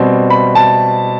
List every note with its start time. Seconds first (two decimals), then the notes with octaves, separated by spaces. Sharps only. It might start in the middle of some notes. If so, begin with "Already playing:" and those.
Already playing: B2 G3 C4
0.30 B5
0.55 A5